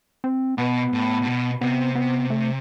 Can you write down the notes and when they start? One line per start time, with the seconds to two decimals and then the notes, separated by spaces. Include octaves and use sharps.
0.24 C4
0.58 B2 B3
0.93 A2
1.22 A2
1.27 B2
1.61 C3 B3
1.95 B3
2.30 A3